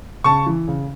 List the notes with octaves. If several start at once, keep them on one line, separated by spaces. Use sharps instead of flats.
C#3 A5 C#6
E3
C#3